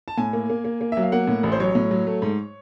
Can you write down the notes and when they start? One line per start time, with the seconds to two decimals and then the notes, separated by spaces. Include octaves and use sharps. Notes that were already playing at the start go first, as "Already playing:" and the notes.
0.08 A5
0.18 A2 G#5
0.33 A#3
0.50 A#3
0.65 A#3
0.81 A#3
0.92 F#3 E5
1.02 F5
1.12 A#3 F#5
1.27 A2
1.43 A1
1.52 C5
1.60 F#3 C#5
1.75 A2
1.91 F#3
2.07 A3
2.22 G#2